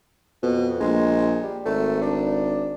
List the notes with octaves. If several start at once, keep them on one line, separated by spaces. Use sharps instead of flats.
F2 B2
A#1 G#3
G3
G#1 A3
D4